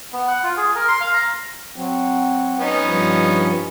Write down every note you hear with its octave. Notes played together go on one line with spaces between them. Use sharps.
B3
F#5
F4
G#4
A#4
C6
F5
A#5
F#3 C4
B3 C#4 D#4
G2 F3